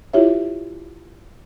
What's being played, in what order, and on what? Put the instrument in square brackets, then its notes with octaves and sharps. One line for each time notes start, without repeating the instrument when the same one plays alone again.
[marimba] E4 F4 G4 C#5 E5